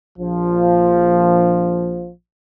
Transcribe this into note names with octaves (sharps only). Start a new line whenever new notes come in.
A#1 F3